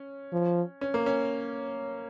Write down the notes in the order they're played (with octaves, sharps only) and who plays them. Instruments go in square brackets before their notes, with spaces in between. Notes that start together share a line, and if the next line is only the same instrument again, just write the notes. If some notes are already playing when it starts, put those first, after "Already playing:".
Already playing: [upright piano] C#4
[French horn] F3
[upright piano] C#4
A#3
C#4